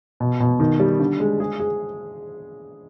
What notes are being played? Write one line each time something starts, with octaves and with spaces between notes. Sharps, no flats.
B2
B2
D#3
G3
D3
G#3
G#4
G#4